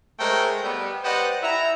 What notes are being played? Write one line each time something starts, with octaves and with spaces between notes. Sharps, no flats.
G#3 A3 A#4 C5 C#5 G5
G3 B3
G4 B4 C5 D5 D#5 F#5
E4 E5 A#5